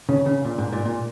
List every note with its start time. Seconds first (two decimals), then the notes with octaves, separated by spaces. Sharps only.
0.09 C#3
0.26 C#3
0.45 A#2
0.58 G#2
0.72 A#2
0.85 A#2